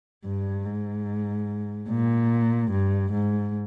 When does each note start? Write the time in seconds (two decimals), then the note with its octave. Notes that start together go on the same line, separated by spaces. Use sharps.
0.24 G2
0.65 G#2
1.88 A#2
2.71 G2
3.12 G#2